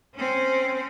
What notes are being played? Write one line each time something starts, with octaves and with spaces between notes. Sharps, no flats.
C4 C#4